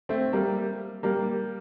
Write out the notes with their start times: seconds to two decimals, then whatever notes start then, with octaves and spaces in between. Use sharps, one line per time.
0.09 A3 C4
0.33 G3 A#3
1.03 G3 A#3